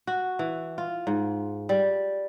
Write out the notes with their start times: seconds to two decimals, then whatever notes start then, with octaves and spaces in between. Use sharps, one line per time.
0.07 F#4
0.39 E3
0.78 F4
1.07 G#2
1.69 G3